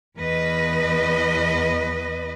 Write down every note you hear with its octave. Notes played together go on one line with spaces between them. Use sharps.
E2 B4 D#5